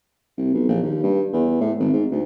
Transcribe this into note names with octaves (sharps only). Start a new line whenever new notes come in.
C2
B1
A#1
D#2
G2
E2
A2
G#1
G#2
D2